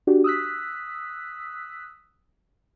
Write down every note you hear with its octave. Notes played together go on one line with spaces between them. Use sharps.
D4 F#4 G4
D#6 E6 F#6 B6